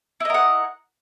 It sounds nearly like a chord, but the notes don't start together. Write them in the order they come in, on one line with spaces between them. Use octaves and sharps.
E4 D#5 A#4 F#5